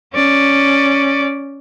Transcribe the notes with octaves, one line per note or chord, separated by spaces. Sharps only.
C#4 D5